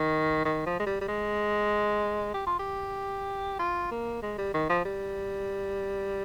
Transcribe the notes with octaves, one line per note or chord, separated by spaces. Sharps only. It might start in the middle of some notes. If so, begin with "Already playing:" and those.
Already playing: D#3
D#3
F3
G#3
G3
G3
G#3
G4
F4
G4
F4
A#3
G#3
G3
D#3
F3
G3